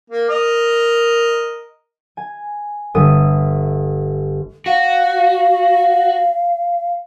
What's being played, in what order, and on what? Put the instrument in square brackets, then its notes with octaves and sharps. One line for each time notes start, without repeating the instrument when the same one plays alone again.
[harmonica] A#3
A#4 D#5
[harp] G#5
G1 A3 D#6 D#7
[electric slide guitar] F#4 [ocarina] F5